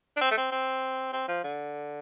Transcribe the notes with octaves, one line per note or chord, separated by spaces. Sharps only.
D4
C4
A3
C4
C4
C4
F3
D3